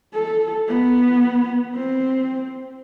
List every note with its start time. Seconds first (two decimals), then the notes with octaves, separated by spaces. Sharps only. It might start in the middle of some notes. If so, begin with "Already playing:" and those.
0.13 A4
0.68 B3
1.75 C4